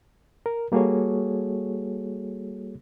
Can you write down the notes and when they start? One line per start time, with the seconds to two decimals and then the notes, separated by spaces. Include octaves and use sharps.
0.46 A#4
0.72 G3 A#3 F#4 G#4 A4 C#5